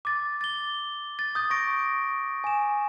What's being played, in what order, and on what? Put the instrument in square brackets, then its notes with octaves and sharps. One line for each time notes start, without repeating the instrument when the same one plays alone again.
[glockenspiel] D6 A6
A6 G7
A6
D#6 G6 A6
C#6 A#6 D7
G#5 E7